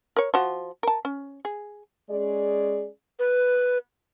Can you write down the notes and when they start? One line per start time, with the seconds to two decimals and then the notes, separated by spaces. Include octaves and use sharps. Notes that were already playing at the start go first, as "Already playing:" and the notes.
0.16 A#4 C#5
0.34 F3 F#4
0.83 A#4 A5
1.05 C#4
1.45 G#4
2.10 G#3 C#4 G#4 D5
3.19 B4